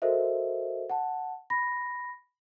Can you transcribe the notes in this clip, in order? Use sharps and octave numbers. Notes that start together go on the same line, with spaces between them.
F#4 A4 A#4 C5 D#5 E5
F#5 A5
B5 A#6